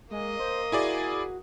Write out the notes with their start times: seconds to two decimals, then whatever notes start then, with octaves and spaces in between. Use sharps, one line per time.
0.11 G#3 A#3 D#5
0.39 C5
0.72 E4 F#4 G#4 D5